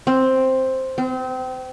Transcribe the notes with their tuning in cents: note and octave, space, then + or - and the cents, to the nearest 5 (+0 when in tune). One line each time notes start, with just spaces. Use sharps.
C4 +5
C4 -30